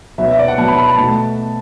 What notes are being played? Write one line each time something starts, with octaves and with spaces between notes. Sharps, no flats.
B2 F#3 B3 E5
E5
D5
F#5
B2 F#3 B3 A5
B5
B5
A5
B2 A3